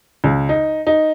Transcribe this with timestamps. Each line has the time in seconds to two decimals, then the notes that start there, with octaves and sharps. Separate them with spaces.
0.24 C#2
0.49 D#4
0.87 D#4